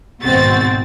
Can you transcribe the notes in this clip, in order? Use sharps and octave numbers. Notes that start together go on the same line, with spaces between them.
G#1 B2 C4 F#4 A6